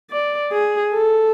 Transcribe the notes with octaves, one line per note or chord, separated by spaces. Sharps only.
D5
G#4
A4